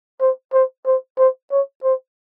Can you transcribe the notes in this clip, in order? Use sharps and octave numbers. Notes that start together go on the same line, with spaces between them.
C5
C5
C5
C5
C#5
C5